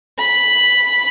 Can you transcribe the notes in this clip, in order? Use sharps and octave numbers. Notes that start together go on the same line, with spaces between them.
B5